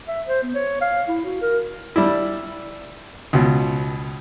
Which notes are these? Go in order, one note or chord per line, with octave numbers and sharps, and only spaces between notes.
E5
C5
B3
C#5
F5
E4
F#4
A#4
G3 D4 E4
C#2 B2